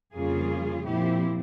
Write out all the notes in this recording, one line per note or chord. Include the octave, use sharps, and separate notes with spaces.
F2 C#3 G3 A#3 F4 G#4
A#2 F3 C4 E4 G4